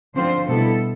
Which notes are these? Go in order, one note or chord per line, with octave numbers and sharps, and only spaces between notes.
D3 F3 C4 F4 C5
B2 G3 B3 E4 A4